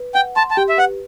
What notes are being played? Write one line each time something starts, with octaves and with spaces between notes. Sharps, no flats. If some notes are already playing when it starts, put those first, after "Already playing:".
Already playing: B4
F#5 G5
A5 C6
A5
G4 G5
E5
B4 F#5